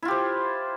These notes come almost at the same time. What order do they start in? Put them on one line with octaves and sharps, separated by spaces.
E4 F4 G4 C5